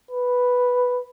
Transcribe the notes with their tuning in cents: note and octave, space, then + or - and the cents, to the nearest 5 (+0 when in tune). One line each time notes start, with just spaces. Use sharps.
B4 +0